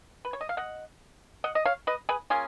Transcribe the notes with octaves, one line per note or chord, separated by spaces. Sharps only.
B4
C#5
D#5
F5
D#5 F#5
D#5 F#5
D#5
C#5 F5
B4 D#5
G#4 B4
A#3 C#4 F4 G#4